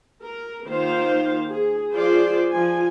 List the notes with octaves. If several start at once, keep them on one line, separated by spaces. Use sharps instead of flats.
A#4
D#3 A#3 F4 C5 F5
G#4
F3 F4 G#4 C5 D5
F3 G#5